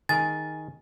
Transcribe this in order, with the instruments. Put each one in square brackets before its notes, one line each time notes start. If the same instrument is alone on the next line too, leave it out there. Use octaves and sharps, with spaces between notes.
[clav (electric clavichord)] D#3 G#4 A#4 [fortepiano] G#5 [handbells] A6